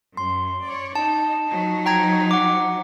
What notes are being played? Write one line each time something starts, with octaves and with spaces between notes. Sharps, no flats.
F#2 C6
C#5 D5
D#4 A5
F3 F#3 D#4
G5 A#5 G#6
F#5 D6